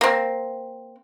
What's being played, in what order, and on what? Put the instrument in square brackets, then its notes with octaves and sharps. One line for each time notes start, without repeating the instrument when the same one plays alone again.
[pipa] A#3 C4